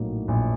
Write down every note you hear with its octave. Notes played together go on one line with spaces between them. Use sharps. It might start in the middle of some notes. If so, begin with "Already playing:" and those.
Already playing: A#1 A2 F#3 A#3 D#4
A#1